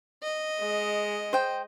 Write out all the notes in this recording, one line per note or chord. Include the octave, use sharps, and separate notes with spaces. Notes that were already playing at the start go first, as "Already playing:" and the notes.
D#5
G#3
C5 G5